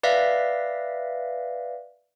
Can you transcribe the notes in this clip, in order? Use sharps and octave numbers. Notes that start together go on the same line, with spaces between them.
B4 D5 E5 F5 A#6 B6